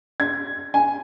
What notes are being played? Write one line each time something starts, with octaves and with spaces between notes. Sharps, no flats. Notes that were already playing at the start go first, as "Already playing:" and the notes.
G#6
G#5